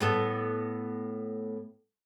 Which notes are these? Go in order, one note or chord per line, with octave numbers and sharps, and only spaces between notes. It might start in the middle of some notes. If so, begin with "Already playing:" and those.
A2 B3 A4